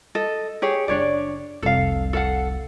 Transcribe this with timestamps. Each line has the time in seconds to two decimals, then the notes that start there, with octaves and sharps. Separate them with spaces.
0.15 A4 D#5
0.62 G4 G#4 C#5
0.88 F#1 D4 C#5 D5
1.62 F1 C2 A4 F5
2.13 A4 F5 F#5